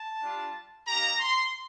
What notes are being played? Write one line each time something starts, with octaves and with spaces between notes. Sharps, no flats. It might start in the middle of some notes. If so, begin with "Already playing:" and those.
Already playing: A5
G3 D4 F4
A#3 D#4 G4 A#5
C6